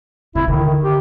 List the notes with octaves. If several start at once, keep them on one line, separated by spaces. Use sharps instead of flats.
C3 E4
D3 D#3
G4